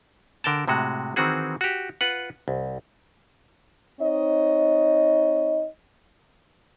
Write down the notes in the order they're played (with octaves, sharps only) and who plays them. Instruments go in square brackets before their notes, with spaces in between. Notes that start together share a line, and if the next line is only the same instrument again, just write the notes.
[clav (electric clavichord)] D3 A#4 G5 A5
A2 C3 G#3 F#4
D#3 E3 C4 F#4 G#4
F#4 G4
F4 B4 F#5
C2
[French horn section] C4 D#4 C#5 D#5